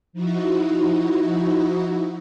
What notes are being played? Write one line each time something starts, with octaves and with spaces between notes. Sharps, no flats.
F3 D#4 E4 F#4